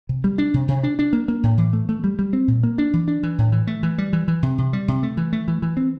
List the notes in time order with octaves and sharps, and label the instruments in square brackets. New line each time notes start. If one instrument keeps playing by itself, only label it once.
[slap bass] C3
G3
D4
C3
C3
D4
D4
A#3
A#3
A2
E3
A3
A3
G3
G3
C4
A#2
A#3
D4
E3
D4
E3
A2
E3
A3
E3
G3
E3
E3
C3
C3
G3
C3
A3
E3
A3
E3
E3
C4